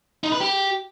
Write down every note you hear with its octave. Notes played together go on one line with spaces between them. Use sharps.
D#4
B4
G4